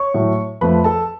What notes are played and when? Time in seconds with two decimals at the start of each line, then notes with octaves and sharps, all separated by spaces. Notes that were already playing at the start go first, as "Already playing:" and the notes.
Already playing: C#5 C#6
0.14 A2 F#3 A3
0.61 F2 F3 A3 B4 B5
0.84 A4 A5